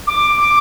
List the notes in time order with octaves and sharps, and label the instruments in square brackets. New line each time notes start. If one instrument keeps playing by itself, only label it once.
[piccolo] D6